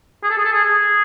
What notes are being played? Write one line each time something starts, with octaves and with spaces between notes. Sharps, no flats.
G#4
A4
G#4
A4
G#4
G#4